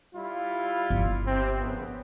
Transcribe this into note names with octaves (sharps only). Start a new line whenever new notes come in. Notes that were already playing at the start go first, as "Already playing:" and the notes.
G3 E4 F4
G1
C3 C4
A#1 C#3 B3